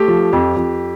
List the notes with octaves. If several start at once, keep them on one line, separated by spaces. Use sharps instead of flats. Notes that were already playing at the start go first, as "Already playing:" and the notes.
Already playing: A3 G4
F3
F2
F2